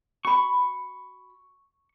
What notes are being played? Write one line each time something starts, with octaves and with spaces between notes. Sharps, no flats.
F#4 B5 C#6